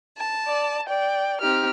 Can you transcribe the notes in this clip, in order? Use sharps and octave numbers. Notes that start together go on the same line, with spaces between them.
A5
D5
D5 G5
C4 D#4 G4 F6